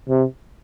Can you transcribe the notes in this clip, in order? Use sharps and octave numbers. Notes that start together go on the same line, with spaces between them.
C3